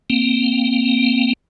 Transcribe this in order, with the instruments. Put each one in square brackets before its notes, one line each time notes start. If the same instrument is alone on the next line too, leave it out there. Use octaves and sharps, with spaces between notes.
[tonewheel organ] A#3 C4